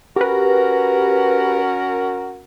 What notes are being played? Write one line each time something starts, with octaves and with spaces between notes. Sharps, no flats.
C#4 F#4 G4 A#4 B4